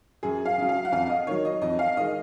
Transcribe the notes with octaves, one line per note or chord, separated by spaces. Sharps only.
F#2 G#4
F5
C#3 F#3
F5
F#5
F2 F5
D#5
D#3 F#3 C#5
D#5
F2 D#5
F5
D#3 G#3 D#5